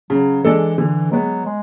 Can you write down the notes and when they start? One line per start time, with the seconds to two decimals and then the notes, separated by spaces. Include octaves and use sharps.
0.10 C#3 F#3
0.44 E3 G#3 D4 A4
0.78 D3 E3
1.12 F#3 G#3 B3
1.46 G#3